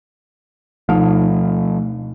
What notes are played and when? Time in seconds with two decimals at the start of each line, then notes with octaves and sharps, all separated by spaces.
0.89 D2 B2 F3 A3 D#4